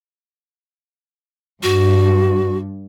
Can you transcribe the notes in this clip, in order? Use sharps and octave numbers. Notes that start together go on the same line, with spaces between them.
G2 F#4